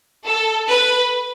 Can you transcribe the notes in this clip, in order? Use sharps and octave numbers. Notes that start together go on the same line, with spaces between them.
A4
B4